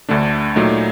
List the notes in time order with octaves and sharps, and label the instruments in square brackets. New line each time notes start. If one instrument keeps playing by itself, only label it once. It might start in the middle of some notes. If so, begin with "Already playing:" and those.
[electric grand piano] D2 D3 A3 D4
A#2 F#3 A3 D#4